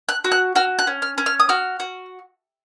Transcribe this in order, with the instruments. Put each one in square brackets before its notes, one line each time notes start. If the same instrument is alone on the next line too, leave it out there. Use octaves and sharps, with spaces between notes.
[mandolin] F#6
F#4
F#6
F#4 F6
F#6
C#4
F6
C#4
F6
D#6
F#4 F6
F#4